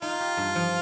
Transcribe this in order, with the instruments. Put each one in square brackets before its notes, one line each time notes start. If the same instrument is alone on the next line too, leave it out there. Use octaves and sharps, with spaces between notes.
[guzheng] D#4 [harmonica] F4
[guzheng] G4
G2
F3